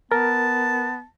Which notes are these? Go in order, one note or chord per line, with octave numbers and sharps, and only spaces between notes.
B3 A#4 A5